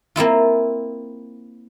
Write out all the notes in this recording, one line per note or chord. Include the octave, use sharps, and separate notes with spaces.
A#3 C4 E4 F4